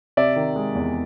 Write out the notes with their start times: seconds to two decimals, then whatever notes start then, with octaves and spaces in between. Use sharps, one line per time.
0.17 C3 D5 E5
0.36 D#3
0.56 G#3
0.75 E2